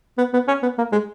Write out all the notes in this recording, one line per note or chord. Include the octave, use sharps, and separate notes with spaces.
B3
B3
C#4
B3
A#3
G#3